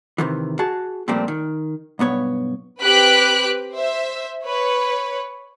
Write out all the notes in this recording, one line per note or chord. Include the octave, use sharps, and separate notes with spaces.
C3 D#3 E3
F#4 G#4 A5
A#2 F3 G3 A3 A#3 C4
D#3
B1 G2 B3 C#5
C4 G4 B4 F#6 B6 D7
C5 E5
B4 C#5